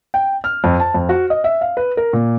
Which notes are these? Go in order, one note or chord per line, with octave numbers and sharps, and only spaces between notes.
G5
F6
F2
A5
F2
F#4
D#5
E5
F5
B4
A#4
A#2